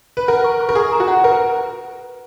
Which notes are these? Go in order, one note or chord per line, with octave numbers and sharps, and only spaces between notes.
B4
A#4 F#5
C#6
C#6
A#4
G#4 C#6
A#5
F#4
F#5
A#4 B4